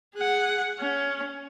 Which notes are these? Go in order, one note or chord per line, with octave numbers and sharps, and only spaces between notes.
G#4 F#5
C#4